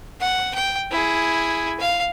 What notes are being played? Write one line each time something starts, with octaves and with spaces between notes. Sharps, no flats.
F#5
G5
E4 G#4
F5